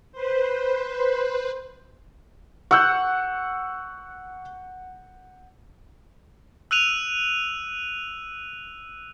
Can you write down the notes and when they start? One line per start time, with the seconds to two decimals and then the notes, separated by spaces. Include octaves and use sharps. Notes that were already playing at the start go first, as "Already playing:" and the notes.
0.12 B4 C5
2.71 F#5 C#6 E6 G6
6.71 E6 F#6 D#7 F7